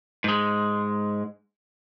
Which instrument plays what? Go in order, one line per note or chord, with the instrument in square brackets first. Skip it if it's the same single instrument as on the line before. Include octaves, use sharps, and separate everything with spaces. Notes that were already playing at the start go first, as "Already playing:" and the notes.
[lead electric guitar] G#2 G#3